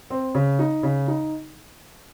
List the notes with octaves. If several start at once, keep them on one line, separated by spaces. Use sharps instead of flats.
C4
C#3
D#4
C#3
D#4